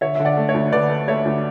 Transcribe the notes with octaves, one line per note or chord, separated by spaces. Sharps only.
D3 C#5 E5
D3 E5
D5 F#5
A3
C#5 E5
D2
D3 B4 D5
A3
A3 C#5 E5
D2